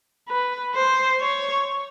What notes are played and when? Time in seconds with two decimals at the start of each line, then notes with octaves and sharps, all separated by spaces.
0.28 B4
0.74 C5
1.20 C#5